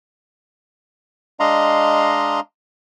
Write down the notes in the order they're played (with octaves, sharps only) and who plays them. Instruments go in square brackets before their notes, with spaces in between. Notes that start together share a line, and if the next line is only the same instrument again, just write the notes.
[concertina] G#3 D4 D#5 F5 A#5 C6